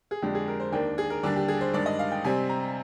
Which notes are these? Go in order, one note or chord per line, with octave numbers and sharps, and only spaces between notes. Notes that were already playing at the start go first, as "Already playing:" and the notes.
G#4
F2 D3 G#3 D4 G4
G#4
A#4
C5
D#2 D#3 A#3 D4 G5
G#4
A#4
D#2 D3 G3 D4 D5
G4
G#4
C5
G2 D#3 G#3 D4 D5
D#5
F5
G5
C3 G3 C4 G#5
A#5